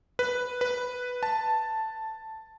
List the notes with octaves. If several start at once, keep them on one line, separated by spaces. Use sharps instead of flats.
B4
B4
A5